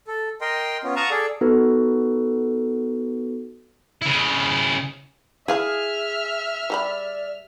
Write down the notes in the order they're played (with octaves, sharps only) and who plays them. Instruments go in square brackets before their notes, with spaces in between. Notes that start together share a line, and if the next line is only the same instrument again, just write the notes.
[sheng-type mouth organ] A4
A#4 D#5 G5 C6
B3 C#4 F4
F5 F#5 A5 A#5 C#6 D#6
G#4 A4 D5
[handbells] B3 D#4 F#4 A4 B4
[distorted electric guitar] C#3 E4
[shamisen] E4 F5 A5 [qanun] G#4 [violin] E5 F6
[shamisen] G3 A4 B5 [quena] D5